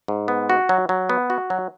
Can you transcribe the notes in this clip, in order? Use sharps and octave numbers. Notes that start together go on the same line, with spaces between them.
G#2
B3
F#4
F#3
F#3
B3
F#4
F#3